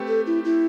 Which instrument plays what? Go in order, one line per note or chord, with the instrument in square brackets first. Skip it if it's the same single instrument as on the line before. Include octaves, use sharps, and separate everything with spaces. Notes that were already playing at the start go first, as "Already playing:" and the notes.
Already playing: [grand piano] A3 C4 G4 B4
[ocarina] A4
E4
E4